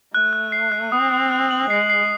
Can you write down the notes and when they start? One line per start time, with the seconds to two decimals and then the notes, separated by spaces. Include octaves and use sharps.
0.14 A3 F#6
0.33 F#6
0.52 C7
0.72 F#6
0.92 C4 D#6
1.11 D#6
1.31 F#6
1.51 F#7
1.70 G#3 C7
1.90 C7